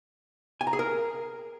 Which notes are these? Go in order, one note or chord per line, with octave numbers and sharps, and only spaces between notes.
G#5
A#5
G#4
A#4